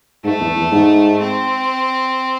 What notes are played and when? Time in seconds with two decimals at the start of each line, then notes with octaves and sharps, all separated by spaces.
0.24 G#2 A3
0.41 E2
0.56 E2
0.72 G#2
1.20 C4